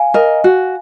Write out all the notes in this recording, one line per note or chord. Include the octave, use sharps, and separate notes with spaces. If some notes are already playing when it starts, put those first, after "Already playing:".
Already playing: F5 G#5
A#4 D#5
F#4